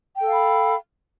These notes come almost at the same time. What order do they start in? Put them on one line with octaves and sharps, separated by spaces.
G5 A4 F5 B5